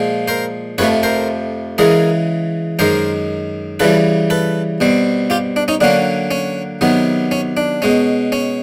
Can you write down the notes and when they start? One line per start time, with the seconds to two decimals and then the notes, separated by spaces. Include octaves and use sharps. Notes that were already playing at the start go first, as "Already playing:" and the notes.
Already playing: A#2 F3 G#3
0.28 A#4 C5
0.78 F2 C3 F3 A3 B4 C#5
1.03 A#4 C5
1.78 C#3 E3 G#3 G#4 A#4
2.79 F#2 D#3 G#3 A#4 C5
3.80 C#3 E3 G3 A4 B4
4.30 A4 B4
4.80 B2 G3 C4
5.30 F4 G4
5.56 D4
5.68 C#4 D#4
5.81 D3 F#3 A#3 C#4 D4
6.31 C#4
6.81 C3 D#3 F#3 B3
7.31 C#4
7.57 D4
7.82 B2 G#3 C#4
8.32 C#4